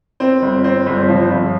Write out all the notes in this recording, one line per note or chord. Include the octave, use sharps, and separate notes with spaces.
C4
G1
C4
G1
F3
G1